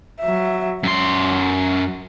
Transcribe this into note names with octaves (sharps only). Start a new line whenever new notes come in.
F#3 E5
F#2 F#3 C6